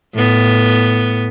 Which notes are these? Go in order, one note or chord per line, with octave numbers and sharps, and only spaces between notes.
A2 B3